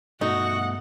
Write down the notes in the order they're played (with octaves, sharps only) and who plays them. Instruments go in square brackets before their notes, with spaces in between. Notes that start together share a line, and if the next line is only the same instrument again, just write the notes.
[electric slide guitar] G2 B2 A3 [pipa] D#4 [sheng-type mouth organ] F#4 C#6 [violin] F#5